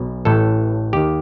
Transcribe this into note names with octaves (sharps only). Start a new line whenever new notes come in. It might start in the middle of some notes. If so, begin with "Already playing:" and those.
Already playing: B1 B2
A1 A2 E3 A4
D#2 D#3 G4